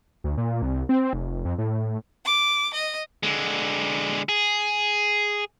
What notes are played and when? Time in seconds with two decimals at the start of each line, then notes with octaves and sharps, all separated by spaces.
0.24 D2
0.38 A#2
0.62 C2
0.89 C4
1.13 F1
1.45 F2
1.58 A2
2.25 D6
2.74 D#5
3.23 D3 G#3
4.29 G#4